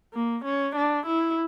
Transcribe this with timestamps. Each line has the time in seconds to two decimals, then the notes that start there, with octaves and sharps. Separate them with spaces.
0.14 A#3
0.45 C#4
0.76 D4
1.07 E4